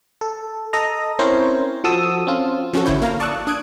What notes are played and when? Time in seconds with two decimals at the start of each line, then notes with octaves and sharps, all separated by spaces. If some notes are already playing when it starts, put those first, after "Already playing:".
0.21 A4
0.73 A4 D#5 A#5
1.19 C4 C#4 E4 A#4 C5 C#5
1.84 F3 F#4 A4 D#6 E6
2.27 C4 C#4 F4
2.73 F3 C#4 F#4 A4
2.85 G#1 D3 E4 C#5 G6
3.02 A#3 F5 A#5
3.20 D5 A5 C#6 D#6 E6 F#6
3.47 D4 D#6 F#6 G#6 D7